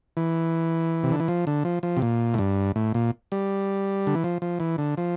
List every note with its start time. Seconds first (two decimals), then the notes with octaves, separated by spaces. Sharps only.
0.17 E3
1.03 C3
1.12 D3
1.20 E3
1.28 F3
1.47 D3
1.65 F3
1.83 F3
1.97 C3
2.02 A#2
2.34 A2
2.38 G2
2.76 A2
2.94 A#2
3.32 G3
4.07 D3
4.15 E3
4.24 F3
4.42 F3
4.60 E3
4.78 D3
4.97 F3